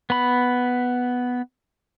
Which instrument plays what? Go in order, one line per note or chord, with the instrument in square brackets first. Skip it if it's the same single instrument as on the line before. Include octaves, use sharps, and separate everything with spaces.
[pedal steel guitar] B3 B5